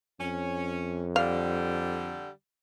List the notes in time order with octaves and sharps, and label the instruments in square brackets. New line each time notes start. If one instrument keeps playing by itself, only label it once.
[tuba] F2 [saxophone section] C#4
[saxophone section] D3 G3 [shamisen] F5